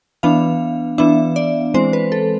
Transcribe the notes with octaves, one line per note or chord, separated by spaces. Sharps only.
E3 B3 D4 F5
E3 B3 D4 E5
D5
E3 G#3 C4 C5
B4
A4